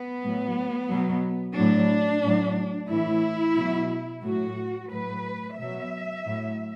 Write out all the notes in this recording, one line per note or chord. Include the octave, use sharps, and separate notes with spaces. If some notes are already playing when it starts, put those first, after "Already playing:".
Already playing: B3
A2 F#3
B2 F#3
A2 F#3 D4
A2 F#3
A2 E3 E4
B2 F#3
A2 F#3 F#4
A2 F#3 B4
B2 F#3 E5
A2 F#3